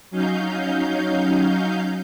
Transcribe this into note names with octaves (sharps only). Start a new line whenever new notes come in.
F#3 C#4 D#4 F5 G6